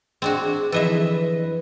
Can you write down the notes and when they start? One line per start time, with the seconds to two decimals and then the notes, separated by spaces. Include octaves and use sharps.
0.22 C4 D4 F#4 G#4
0.72 F2 D3 E3 A4 B4 D#5 E5